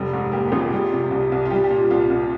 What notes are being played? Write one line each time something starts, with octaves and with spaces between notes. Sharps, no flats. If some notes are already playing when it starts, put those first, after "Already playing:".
Already playing: F1 G3
G#2
A#3 G4
G4
G#1 F4 G#4
G3 F4
C3
C2
C2
F4
G3 G4
G4
A#2
F4
C2 F4
C2